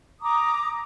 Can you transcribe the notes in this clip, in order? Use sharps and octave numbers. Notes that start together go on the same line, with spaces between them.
A#5 D6 D#6